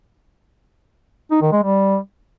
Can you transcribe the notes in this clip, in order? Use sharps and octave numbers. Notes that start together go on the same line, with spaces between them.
D#4
D#3
G#3
G3